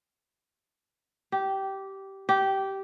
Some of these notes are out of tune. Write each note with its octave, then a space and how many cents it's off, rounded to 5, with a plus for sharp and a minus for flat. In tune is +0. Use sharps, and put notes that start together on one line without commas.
G4 -15
G4 -15